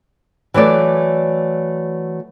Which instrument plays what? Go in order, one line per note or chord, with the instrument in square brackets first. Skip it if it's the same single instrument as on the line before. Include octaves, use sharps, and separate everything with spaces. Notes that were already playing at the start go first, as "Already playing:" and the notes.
[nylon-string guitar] E3 F#3 A3 D5